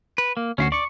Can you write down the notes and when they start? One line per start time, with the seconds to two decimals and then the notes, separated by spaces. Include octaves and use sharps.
0.18 B4
0.37 A#3
0.58 D2 C#4 E4 F#4 C7
0.72 D5 C#6 C#7